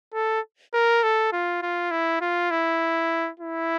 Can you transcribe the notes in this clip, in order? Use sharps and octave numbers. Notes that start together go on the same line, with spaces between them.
A4
A#4
A4
F4
F4
E4
F4
E4
E4